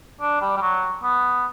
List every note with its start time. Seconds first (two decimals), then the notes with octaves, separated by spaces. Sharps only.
0.21 D4
0.41 G3
0.57 G3
0.61 F#3
1.03 B3